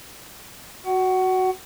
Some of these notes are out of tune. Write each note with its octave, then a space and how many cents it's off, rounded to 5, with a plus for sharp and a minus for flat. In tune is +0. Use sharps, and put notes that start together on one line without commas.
F#4 +0 F#5 +25